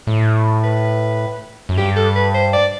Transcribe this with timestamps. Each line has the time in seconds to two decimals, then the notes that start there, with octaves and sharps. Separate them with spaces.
0.07 A2
0.64 B4
1.69 F#2
1.77 G2 G4
1.96 A4
2.15 B4
2.34 C5
2.53 D5